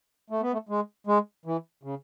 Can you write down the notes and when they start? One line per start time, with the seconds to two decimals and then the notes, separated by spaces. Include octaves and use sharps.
0.30 A3
0.41 B3
0.53 A3
0.69 G#3
1.07 G#3
1.45 E3
1.83 C#3